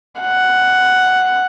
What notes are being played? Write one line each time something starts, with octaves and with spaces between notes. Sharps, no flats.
F#5